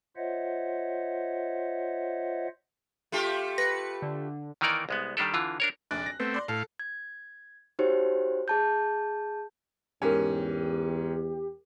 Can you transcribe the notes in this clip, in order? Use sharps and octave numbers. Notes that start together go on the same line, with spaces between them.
F4 C5 C#5 D#5 E5 F#5
A3 F4 G4
B4 A#6 C#7
D3
D#3 E3 A#3 D#4 A#4 D5
C2 G#3 B3
D#3 G3 D4 G4 A4
D3 E3 F4
D4 A#4 C#5
F1 A#1 D5 F#6
A#6
A3 B3 C4
D5 C6
A2 A4 F5
G#6
D#4 F#4 G4 C5 C#5
G#4 A5 G6
E2 G#2 C#4 G4 A#4 G#5